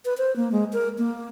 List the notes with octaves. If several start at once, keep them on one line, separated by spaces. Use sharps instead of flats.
B4
C5
A#3
G#3
A#4
A#3